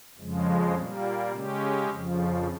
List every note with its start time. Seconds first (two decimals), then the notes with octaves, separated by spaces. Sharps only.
0.18 F2 C#3 F3 G#3
0.74 A#2 G3 A#3
1.33 C#3 G#3 C#4 G4
1.90 F2 C#3 F3